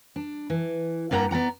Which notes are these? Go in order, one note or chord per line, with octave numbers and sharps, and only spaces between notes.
D4
E3
G2 G3 A#3 F#5 A#5
B3 D5 F#5 A#5